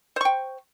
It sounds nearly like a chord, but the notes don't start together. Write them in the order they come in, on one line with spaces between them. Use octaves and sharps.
C5 C#6 G5